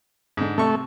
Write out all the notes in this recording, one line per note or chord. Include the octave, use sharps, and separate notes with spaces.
G#2 D3
C3 A3 C#6